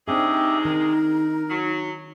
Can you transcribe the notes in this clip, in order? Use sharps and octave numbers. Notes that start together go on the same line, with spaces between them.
C3 G#3 C4 D4 D#4 G4 G#4 E5
D#3 A#4
F#3